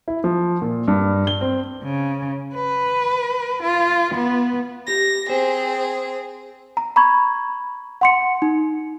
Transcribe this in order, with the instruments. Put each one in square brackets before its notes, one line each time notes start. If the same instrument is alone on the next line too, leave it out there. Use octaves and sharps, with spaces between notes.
[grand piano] E4
F3
A#2
G2
G7
C4
[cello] C#3
B4
F4
B3
[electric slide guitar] G4 [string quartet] A#6
[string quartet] C4 G#4 [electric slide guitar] C5
[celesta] A#5
A#5 B5 C#6 G#6
F#5 C6 C#7
D#4